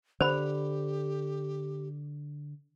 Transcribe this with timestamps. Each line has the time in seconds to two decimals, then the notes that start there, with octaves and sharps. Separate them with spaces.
0.21 D3 G4 C5 B5